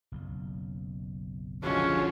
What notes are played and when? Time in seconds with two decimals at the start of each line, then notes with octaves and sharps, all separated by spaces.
0.12 F#1 B1
1.63 D3 F3 G#3 C#4 F#4